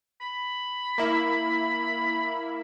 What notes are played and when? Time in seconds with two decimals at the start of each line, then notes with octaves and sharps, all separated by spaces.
0.21 B5
0.98 A#3 E4